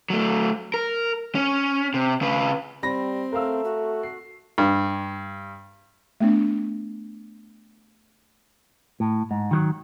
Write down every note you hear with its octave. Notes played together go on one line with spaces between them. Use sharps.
F#3 A3
A#4
C#4
C3
C#3 B4
G3 C4 B5 A#6
A3 A#4 F5 E6
F#4
C7
G2
A3 B3 D4
A2
G#2
D#3 F3 F#3